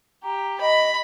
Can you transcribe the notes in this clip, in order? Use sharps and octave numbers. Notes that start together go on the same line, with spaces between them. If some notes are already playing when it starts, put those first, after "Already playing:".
G4 A#5
D#5 B5